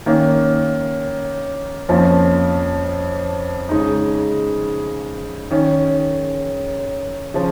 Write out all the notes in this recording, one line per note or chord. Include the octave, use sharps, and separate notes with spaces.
D#3 A#3 C#4
F2 F3 A#3 C#4
C#3 G#3 D#4
D#3 C#4
C#3 F3